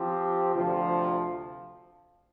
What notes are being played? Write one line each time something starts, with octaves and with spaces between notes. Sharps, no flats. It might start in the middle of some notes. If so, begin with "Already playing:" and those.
Already playing: F3 C4 G4
D2 C3 F3